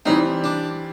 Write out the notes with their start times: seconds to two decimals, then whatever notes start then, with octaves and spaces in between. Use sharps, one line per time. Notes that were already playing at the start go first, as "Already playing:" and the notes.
0.05 E3 G3 C4 D#4
0.44 D4